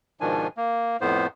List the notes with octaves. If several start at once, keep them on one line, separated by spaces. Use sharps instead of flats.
G#2 B2 D#3 F3 D4 G#5
A#3
F2 A2 B3 C5